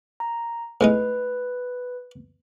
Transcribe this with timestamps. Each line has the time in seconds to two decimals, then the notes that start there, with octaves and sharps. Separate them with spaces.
0.20 A#5
0.81 A2 G#3 D#4 B4